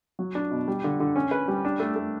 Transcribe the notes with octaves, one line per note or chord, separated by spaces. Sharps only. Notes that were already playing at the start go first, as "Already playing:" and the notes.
F#3
D4
B2
G3
D3
D3
C#4
B4
G3
D4
A3
A3